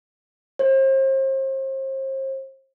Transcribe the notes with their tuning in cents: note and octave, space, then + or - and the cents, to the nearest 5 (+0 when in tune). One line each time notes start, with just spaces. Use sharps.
C5 +40